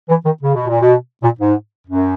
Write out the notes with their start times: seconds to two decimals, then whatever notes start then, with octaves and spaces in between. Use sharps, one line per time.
0.09 E3
0.25 D#3
0.42 C#3
0.54 B2
0.68 A#2
0.82 B2
1.23 A#2
1.39 G#2
1.87 F#2